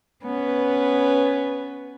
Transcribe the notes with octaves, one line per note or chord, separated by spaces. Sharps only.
B3 C#4 B4